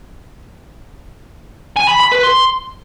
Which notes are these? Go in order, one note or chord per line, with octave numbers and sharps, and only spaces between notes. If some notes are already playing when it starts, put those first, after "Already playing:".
G#5
B5
B5
B4
C6